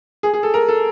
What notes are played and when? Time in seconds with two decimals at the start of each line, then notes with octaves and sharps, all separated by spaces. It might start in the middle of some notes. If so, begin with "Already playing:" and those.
0.23 G#4
0.34 G#4
0.43 A4
0.54 A#4
0.68 A4